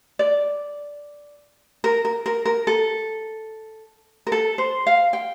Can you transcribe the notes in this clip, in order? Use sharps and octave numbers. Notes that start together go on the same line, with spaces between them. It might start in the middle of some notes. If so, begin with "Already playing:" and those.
D5
A#4
A#4
A#4
A#4
A4
A#4
A4
C5
F5
G5